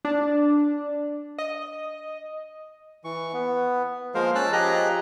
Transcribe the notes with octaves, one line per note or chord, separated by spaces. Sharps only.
D4
D#5
E3 C#6
B3
F3 G#3 A#3 A#4 C5 F5
C#4 A5 E6 F#6
F3 G4 G#4 D#5 A#5 F#6